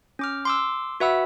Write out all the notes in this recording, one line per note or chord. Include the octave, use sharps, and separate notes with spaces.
C#4 D6 F6
C6 D6 E6
F#4 B4 E5 F#5 B5 E6